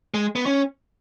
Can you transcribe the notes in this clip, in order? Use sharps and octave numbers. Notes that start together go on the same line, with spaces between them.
G#3
B3
C#4